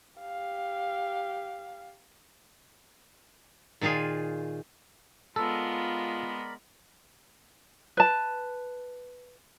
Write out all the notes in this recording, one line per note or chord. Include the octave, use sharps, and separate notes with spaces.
G4 F5
A#2 D#3 D#4 F4 G#4
G#3 B3 F4 A4 A#4 D5 B5
B4 A5